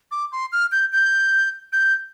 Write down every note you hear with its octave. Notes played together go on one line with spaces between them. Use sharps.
D6
C6
F6
G6
G6
G6